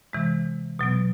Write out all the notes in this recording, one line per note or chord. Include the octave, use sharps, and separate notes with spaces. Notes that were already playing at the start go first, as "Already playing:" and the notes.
C3 E3 G#3
B2 F#3 B3